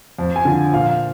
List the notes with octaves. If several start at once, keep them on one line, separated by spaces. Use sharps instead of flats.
F2
G#5
D3 F3
A#2 F5